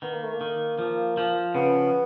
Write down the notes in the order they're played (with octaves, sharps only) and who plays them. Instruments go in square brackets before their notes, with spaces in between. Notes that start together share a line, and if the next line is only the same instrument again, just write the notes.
[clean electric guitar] D#3 [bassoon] B3
[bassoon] A#3
A3
A#3
[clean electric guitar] D#3
F3
F3
[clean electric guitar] C#3 [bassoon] B3